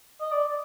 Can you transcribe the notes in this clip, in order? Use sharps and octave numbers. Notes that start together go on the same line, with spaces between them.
D#5
D5